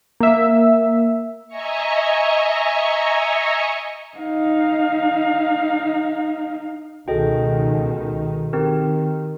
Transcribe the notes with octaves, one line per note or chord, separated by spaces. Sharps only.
A#3 E5
D#5 E5 G#5 A#5 C#6 C#7
D#4 F5
C#2 B2 D#3 F#4 G#4 A4 D#5 G5
D#3 C4 G4 A#4